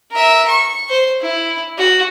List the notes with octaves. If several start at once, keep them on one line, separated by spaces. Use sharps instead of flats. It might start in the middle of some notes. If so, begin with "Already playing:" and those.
A#4 E5
C#6
C5
E4
F#4